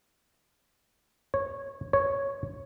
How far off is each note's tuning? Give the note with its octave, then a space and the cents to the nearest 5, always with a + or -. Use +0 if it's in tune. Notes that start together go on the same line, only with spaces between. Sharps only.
C#5 -15
C#5 -5